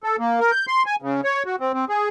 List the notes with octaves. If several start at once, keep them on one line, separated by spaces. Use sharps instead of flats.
A4
A#3
A#4
G6
C6
G#5
C#3
C#5
F#4
C4
C4
G#4